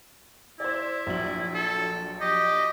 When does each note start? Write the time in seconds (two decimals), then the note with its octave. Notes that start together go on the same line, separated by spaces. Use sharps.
0.60 E4 C5 D5
1.06 A#1 F#3 F#7
1.55 A4
2.21 G4 D#5